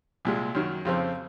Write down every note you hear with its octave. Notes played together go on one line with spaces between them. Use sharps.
C2 A#2 G#3
F#2 D#3 F#3
F2 C#3 F3 C4